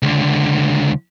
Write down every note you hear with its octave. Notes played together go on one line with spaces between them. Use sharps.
C#2 D3